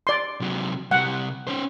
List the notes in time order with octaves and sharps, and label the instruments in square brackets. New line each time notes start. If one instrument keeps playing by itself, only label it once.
[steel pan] D5 C6
[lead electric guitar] C3 F#3
[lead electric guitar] C3 G3 [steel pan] F#5
[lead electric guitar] C#4 C5